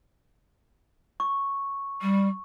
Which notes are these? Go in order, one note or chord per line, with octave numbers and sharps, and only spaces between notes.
C#6
G3